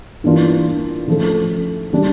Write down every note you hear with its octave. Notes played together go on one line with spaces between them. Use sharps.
G2 E3 A#3 D4 F4
C#3 F3 A3
C#3 G3 D4